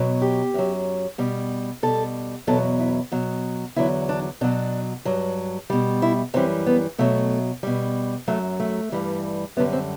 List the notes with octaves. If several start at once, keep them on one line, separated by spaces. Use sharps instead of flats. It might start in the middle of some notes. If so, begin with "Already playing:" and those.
Already playing: B2 F#3
G4
F#2 F#3
B2 G3
B2 G3 A4
E2 B2 F#3 A4
E4
B2 F#3
E2 D3 F#3 E4
D4
B2 F#3 D4
G2 F#3
B2 G3
E4
F#2 E3 G3 C4
B3
B2 F#3 A3
B2 G3
F#2 F#3 A3
A3
G2 E3 G3
F#2 D3 G3 B3
C4